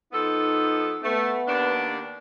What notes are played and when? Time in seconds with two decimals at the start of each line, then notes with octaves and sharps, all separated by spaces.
0.13 F3 B3 D#4 A4
1.04 A3 B3
1.48 D#2 D4